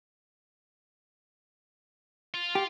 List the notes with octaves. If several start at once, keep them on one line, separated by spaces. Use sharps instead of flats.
F4
G4